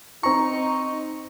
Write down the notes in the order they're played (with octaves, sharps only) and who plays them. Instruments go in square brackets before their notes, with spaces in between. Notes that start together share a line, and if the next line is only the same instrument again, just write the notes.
[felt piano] C4 A#5 [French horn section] D#4 [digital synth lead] C#6